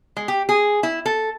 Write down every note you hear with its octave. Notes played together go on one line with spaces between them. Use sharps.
G#3
G4
G#4
E4
A4